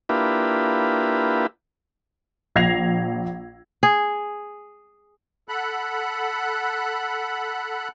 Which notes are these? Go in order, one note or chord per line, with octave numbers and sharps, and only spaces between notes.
A#3 D4 E4 F4 G4 B4
A#1 G#6 A#6 C7 F7
G#4
A4 F#5 B5 F#6